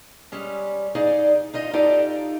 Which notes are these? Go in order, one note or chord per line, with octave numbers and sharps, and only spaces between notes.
G3 G#3 C#4
D#4 G#4 D5 F5
D#4 F4 D#5
D#4 F4 G4 A4 D5